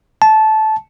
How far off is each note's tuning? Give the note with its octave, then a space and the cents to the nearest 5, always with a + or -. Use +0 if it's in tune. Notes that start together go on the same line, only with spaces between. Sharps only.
A5 -15